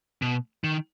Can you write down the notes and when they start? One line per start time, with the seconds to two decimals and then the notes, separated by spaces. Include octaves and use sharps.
0.22 B2
0.64 D#3